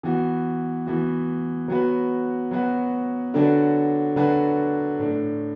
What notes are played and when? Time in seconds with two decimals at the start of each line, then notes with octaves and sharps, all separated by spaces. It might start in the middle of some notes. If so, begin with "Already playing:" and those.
0.03 E3 B3 F#4
0.86 E3 B3 F#4
1.68 F#3 B3 F#4 B4
2.51 F#3 B3 F#4 B4
3.34 D3 F#3 D4 F#4 B4
4.16 D3 F#3 D4 F#4 B4
4.99 A2 A3 D4